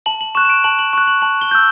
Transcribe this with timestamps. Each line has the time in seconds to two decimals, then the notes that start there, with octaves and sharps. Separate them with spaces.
0.06 A5 F#7
0.21 F#7
0.35 C#6 F#6 E7
0.45 E7
0.49 D7
0.64 A5 F#7
0.79 F#7
0.93 C#6 F#6 F#7
1.08 F#7
1.22 A5 F#7
1.41 G7
1.51 E6 G6